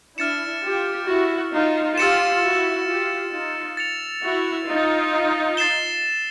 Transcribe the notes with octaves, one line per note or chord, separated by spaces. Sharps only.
D4 E4 F6 A6 C#7 E7
F4 G4
E4 F#4
D#4 F4
F4 G4 E6 A6 C#7 E7
E4 F#4
F4 G4
D#4 F4
A6 C#7 F7
E4 F#4
D#4 F4
A6 C7 E7 G7